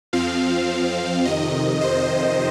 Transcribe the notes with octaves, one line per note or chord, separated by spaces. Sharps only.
F2 F3 C4 F5
F2 C3 D#3 D#5
C5